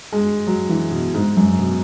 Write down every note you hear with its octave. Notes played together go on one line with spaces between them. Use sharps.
G#3
F#3
E3
B2
G#2
F#2
B2